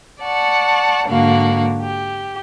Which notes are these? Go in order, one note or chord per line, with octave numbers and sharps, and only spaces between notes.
D5 F#5 A5 C#6
G#2 D3 A#3 F#4 F5
G4